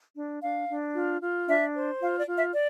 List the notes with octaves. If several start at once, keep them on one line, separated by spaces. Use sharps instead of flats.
D4
D4 F5
D4
F4
F4
D4 E5
C5
F4 F5
D5
F4
E5
D5